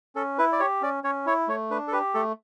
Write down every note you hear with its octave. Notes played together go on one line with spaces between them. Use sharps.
C#4 A4
E4 B4
D5
G4 C#5
C#4 D5
C#4 C#5
E4 C#5
A3 C#5
D4 B4
A4
G4 B4
A3 A4